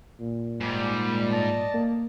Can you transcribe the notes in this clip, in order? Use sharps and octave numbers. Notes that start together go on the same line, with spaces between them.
A#2
G#2 G3
D5 D#5 A5
A#3